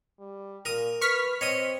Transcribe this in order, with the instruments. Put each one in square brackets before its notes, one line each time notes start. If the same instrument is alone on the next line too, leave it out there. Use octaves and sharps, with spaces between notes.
[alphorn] G3
[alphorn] A#2 [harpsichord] A#4 D#6
[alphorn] B4 [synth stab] C#6 F6 B6
[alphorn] C4 [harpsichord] C#5 D#5 D#6